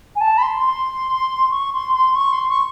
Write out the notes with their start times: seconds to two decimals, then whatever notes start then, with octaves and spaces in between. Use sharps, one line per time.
0.15 G#5
0.21 A5
0.38 B5
0.42 C6
0.64 C6
1.51 C#6
1.73 C6
1.93 C6
2.15 C#6
2.32 C6
2.48 C#6